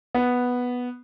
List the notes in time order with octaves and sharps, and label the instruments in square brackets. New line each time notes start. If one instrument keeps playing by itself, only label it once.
[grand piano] B3